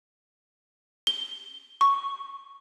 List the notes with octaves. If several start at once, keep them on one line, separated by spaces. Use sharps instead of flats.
G7
C#6